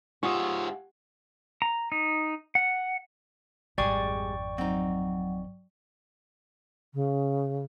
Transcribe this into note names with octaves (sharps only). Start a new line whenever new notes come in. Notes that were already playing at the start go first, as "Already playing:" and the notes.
G#2 F4 G4 E5 F#5 G#5 C#6 D#6
A#5
D#4
F#5
G#1 F2 G3 G#3 G#4 D5 G5 C#6
F#3 C4 D#4
C#3